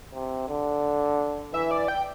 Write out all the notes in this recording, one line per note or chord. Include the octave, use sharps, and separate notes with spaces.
C3
D3
E3 E5
D5
G5